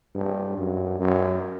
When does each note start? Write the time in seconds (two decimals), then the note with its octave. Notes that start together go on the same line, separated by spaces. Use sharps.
0.15 G2
0.58 F#2
1.00 F#2